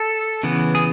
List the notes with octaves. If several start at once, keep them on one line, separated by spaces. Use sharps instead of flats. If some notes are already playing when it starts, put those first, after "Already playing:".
Already playing: A4
C#3 E3 B3
G#4